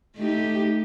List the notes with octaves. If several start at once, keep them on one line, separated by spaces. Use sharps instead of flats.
A3 D#4 G4